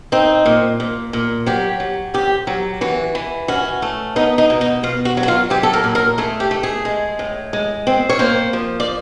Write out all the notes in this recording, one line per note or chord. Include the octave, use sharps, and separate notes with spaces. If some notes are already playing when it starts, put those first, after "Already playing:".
C4 D#4
A#2
A#2
A#2
F#3 G4
F#3
F2 G4
F#3
E3 F#4
E3
C#4 F#4
A3
B3 D#4
D#4
B2
D#4
B2 F4
F#4
F#3
F#4
F4
F#3 G4
A4
A#4
A#2
A#4
A3 G#4
G4
A3
G#4
G#3
A2
G#3
C4
C#5
A#3 C5
F3
D5